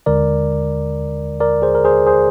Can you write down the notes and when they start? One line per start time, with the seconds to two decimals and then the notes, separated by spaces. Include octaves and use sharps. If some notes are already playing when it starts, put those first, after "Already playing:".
0.06 D#2 D3 G#3 A#4 D5
1.40 A#4 D5
1.62 G#4 C5
1.75 A#4
1.85 G#4 C5
2.06 G#4 C5